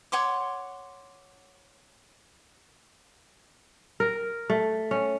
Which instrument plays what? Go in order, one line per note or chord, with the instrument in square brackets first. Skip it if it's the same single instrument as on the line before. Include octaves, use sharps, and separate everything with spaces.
[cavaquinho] C#5 F#5 C6 D6
[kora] A#4
A3
C#4